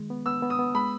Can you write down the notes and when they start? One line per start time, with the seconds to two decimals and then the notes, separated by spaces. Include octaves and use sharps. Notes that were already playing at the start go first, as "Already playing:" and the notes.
Already playing: D#3 G#3
0.10 B3
0.26 B3 E6
0.42 B3
0.50 D#6
0.59 B3
0.75 G#3 B5